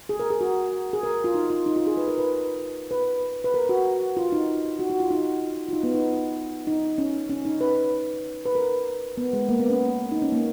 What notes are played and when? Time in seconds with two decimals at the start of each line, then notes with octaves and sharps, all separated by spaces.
0.09 G#4
0.20 A#4
0.30 G#4
0.41 F#4
0.93 G#4
1.03 A#4
1.24 F4
1.34 D#4
1.50 F4
1.66 D#4
1.76 F4
1.87 G#4
1.97 B4
2.08 A#4
2.18 B4
2.91 B4
3.44 B4
3.54 A#4
3.69 F#4
4.17 F4
4.32 D#4
4.79 F#4
4.90 F#4
5.00 F4
5.11 D#4
5.69 F4
5.73 D#4
5.83 B3
5.95 D#4
6.67 D#4
6.98 C#4
7.29 C#4
7.45 D#4
7.61 B4
8.46 B4
8.55 A#4
9.18 B3
9.33 G#3
9.49 A#3
9.60 B3
9.70 C#4
10.12 D#4
10.22 C#4
10.32 A#3